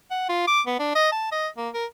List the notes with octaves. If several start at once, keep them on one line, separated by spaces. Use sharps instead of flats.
F#5
F4
D6
B3
D4
D#5
A5
D#5
A#3
A#4